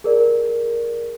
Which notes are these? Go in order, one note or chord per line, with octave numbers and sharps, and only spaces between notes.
G#4 A#4 D5